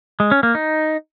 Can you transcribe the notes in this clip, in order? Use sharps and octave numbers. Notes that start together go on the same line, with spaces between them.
G#3
C#4
A#3
D#4